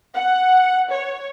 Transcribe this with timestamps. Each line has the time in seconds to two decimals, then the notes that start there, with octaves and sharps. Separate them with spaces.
0.14 F#5
0.91 C#5